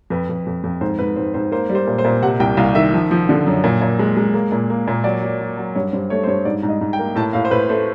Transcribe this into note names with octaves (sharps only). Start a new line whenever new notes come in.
F2 B4
F2
F2
F2
G#2 C5
G#2 B4
G#2 C5
G#2 C5
A#3 C5
G3
C5
A#2
C5
A#2
C3 F#5
C2 G5
C2 F5
D#3 E5
F3
F3
D3
F#2
A#2
A#2
G#3
G#3
A#3
A#2
A#3
A#2
F#3 D5
F#3
F#3
F#3
G2 C#5
G2 C5
A3 C#5
C5
G2 C#5
G#2 D5
G#2
D#5
G#2
G5
A#3
A2 A5
A2 F5
C5
A2 B4
A3 C5